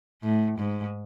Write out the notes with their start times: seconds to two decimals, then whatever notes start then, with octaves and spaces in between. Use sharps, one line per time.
0.23 A2
0.58 G#2